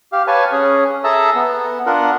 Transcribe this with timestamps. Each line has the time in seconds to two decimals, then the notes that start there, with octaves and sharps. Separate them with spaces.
0.13 G4 F5
0.27 B4 C#5 F5 G#5 A5
0.52 C#4 G#4
1.04 G#4 A4 E5 A5 A#5 E6
1.35 B3
1.86 D4 F4 A#4 F#5